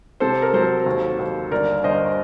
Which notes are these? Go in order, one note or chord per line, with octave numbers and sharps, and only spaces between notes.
C3 A4 C5
A#4
F#3 A4 C5
D#2
D#2
G1 A#4 D5
G1 C5 D#5